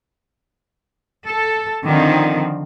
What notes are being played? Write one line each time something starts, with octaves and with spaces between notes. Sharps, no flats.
A4
D3 D#3 F3 C4